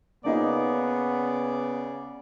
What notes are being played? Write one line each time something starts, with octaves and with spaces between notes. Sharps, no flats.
C#3 A#3 B3 D#4 F4 D5